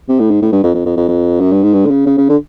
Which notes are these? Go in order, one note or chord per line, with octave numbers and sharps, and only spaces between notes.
C3
A2
G#2
A2
G2
F2
F2
F2
F2
F2
F#2
G2
G#2
G2
D3
C#3
C#3
C#3
D3